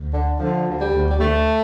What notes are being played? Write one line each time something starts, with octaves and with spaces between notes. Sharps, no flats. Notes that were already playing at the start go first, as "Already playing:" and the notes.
Already playing: D2
D3
D3 F3
D2
G3
D2
G3
D2 A3